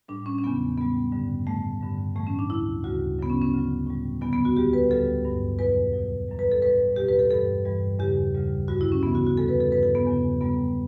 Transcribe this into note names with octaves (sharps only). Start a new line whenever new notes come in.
A2 G3 D4
C#4
C#4
E2 C#3 F#3 B3
A2 G3 B3
G2 D3 G3
A2 G3 A3
G2 D3 G3
A2 E3 G3 A3
C#4
D4
D2 D3 F#3 E4
D2 C#3 G3 F#4
F#2 C#3 F#3 B3
C#4
C#4
D2 D3 F#3
A2 G3
E2 D3 F#3 B3
B3
F#4
D2 D3 G3 G4
B4
D2 D3 G3 A4
G2 F#3
E2 B2 F#3 B4
E2 B2 F#3
F#2 E3 G3
B4
A4
A2 G3 B4
E2 B2 G3 G4
B4
A4
G2 E3 G3 A4
G2 E3 G3
E2 C#3 G3 G4
D2 C#3 G3
G2 D3 G3 F#4
E4
C#4
D2 C#3 E3 B3
F#4
F#4
E2 D3 G3 A4
B4
A4
G2 E3 G3 B4
A4
B3
E2 C#3 F#3
F#2 C#3 G3 B3